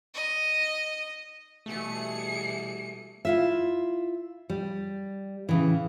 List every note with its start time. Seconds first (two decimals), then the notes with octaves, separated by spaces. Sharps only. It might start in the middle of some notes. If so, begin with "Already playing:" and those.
0.14 D#5
1.66 B2 E3 G3 A3 G#4 C#7
3.25 E4 F4 E5
4.50 G3
5.49 A2 C#3 E3